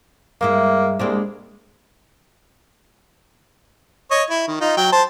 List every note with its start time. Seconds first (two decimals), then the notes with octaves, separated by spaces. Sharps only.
0.41 G2 G#3 A#3 E4
0.99 C2 G#3 A#3 D4
4.11 C#5 D#5
4.30 E4
4.48 D#3
4.61 D#4 F4
4.77 F#3 G5
4.92 C5 A5